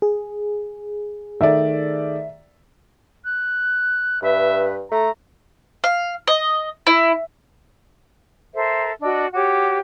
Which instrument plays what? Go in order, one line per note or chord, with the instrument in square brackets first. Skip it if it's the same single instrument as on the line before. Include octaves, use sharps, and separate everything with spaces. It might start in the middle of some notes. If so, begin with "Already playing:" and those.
[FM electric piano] G#4
[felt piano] D#3 A3 D5 [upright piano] E5
[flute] F#6
[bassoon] G2 [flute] B4 [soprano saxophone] E5
[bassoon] A3 [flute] A4 [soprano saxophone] A#5
[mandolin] F5
D#5
E4
[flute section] A4 A#4 C5 E5
D4 F#4 D#5 E6
F#4 G4 C#5 D6